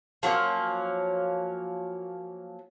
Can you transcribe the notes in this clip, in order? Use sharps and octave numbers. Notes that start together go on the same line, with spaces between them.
F3 F#3 A#3 C#4